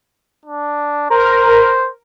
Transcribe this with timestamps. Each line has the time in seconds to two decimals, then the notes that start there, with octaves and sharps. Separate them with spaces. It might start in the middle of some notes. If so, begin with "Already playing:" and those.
0.46 D4
1.10 A#4 C5